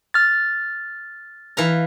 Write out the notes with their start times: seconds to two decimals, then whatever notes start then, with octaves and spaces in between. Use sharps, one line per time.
0.14 F6 A6
1.57 E3 F5 A#5